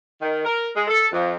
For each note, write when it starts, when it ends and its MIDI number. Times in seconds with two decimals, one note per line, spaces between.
0.21 0.45 51
0.45 0.69 70
0.75 0.86 56
0.88 1.08 69
1.12 1.34 41